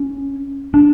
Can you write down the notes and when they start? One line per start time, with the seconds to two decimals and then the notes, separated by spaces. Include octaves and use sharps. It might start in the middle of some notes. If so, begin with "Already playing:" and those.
Already playing: C#4
0.74 D4